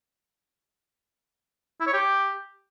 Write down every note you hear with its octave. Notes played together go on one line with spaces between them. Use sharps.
E4
C#5
G4